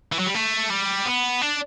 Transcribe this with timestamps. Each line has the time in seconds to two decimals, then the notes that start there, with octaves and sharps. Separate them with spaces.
0.12 E3
0.19 F#3
0.27 G3
0.35 A3
0.70 G3
1.06 B3
1.41 D4